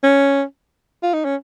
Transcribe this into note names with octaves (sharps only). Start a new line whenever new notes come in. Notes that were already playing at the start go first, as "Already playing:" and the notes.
C#4
F4
D#4
C#4